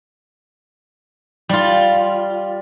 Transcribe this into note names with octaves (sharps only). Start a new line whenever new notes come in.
G3 F4